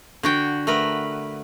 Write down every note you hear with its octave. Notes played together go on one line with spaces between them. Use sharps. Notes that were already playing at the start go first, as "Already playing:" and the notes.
D3 F#4 G5
A3 A#4 B4